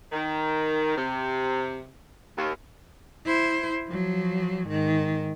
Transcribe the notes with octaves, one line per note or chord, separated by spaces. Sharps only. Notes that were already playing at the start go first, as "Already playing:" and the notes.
D#3
C3
D#2
E4 C5
F3 F#3
G#2 D#3